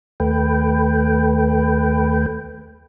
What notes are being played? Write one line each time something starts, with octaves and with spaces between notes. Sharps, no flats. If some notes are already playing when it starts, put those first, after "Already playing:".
D#2 A3 B4 G5